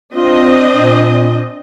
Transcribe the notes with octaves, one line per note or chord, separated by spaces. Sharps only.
C4 D4 F4 D#5
A#2